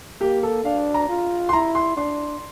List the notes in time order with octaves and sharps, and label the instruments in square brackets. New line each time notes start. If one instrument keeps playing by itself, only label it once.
[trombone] A#3 [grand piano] G4
[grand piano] A4
[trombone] D4 [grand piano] F5
[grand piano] A#5
[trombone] F4
[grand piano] C6
[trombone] E4 [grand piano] A#5
[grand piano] C6
[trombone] D4 [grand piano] C6